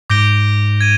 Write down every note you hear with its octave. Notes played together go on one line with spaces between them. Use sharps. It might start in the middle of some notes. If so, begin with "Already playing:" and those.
G#2 D6 G6 A#6 D7 G7
G#6 D#7